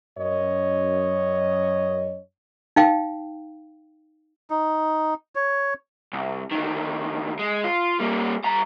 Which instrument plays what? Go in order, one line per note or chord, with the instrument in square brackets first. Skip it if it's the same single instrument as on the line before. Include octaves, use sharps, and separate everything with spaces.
[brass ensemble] F#2 C#5 D#5
[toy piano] D#4 F5 G5
[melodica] D#4
C#5
[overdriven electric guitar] C2
D2 D#3
G#3
F4
G3 A#3
G2 A#5